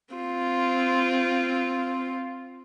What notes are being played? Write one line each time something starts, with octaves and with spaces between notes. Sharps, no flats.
C4 F4